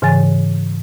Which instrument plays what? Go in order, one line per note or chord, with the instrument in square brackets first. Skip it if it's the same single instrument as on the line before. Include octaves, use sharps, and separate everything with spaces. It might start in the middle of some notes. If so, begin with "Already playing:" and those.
[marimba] G#2 C#3 E3 C#5 G#5 A6